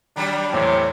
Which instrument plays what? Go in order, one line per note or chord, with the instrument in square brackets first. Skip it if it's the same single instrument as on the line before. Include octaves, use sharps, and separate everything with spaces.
[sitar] D#3 F#3 G3 [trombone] D4
[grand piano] E2 A2 [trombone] C3 [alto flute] C#5